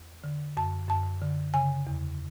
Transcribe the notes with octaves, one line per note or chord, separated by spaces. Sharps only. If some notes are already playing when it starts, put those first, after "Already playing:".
Already playing: E2
D3
F#2 A5
F#2 A5
D3
C#3 G#5
E2